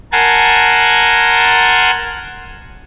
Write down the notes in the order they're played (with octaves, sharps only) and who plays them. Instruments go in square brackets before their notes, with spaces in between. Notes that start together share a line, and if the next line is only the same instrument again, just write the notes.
[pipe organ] A#4 F#5 G#5 A5 C6